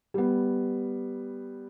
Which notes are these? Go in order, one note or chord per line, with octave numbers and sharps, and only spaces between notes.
G3 B3